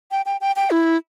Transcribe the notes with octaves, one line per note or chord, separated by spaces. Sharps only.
G5
G5
G5
G5
E4